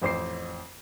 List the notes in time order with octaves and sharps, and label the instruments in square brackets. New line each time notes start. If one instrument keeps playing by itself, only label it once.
[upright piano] A1 F2 C5 D6 C7